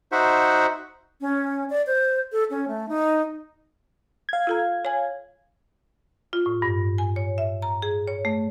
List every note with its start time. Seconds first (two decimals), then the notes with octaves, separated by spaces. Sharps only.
0.12 D#4 F#4 C5 E5 F#5
1.21 C#4
1.70 D5
1.87 C5
2.32 A4
2.50 C#4
2.68 A3
2.89 D#4
4.29 F5 G#6
4.47 F4 A4 A#5
4.85 C#5 G#5
6.33 F4
6.46 A2
6.62 G2
6.98 G#5
7.16 C#5
7.38 E5
7.62 A#5
7.82 G#4
8.07 C#5
8.25 A3